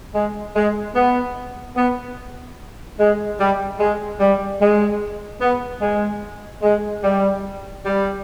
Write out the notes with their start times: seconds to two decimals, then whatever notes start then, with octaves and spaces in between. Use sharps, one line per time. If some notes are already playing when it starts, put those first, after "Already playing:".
0.14 G#3
0.56 G#3
0.95 B3
1.77 B3
2.99 G#3
3.39 G3
3.80 G#3
4.20 G3
4.61 G#3
5.41 B3
5.82 G#3
6.62 G#3
7.03 G3
7.84 G3